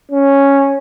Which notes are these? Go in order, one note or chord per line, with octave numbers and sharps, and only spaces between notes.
C#4